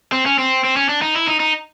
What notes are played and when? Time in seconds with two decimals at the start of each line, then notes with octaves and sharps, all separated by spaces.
0.12 C4
0.26 C#4
0.39 C4
0.64 C4
0.77 C#4
0.89 D4
1.02 D#4
1.16 E4
1.27 D#4
1.40 D#4